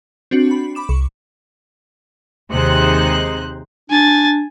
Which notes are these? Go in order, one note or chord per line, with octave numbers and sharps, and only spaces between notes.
C4 D4 F#4
B5
B5 D6 E7
C2 C#6
D#2 C3 G#3 D#4 C5 F#6
D4 G#5 A6